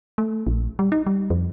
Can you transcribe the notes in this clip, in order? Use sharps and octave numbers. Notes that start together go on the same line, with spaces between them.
A3
A#1
G3
D#4
G3
F2